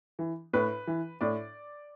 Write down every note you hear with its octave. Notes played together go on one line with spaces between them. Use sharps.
E3
A2 B4
E3
A2 D5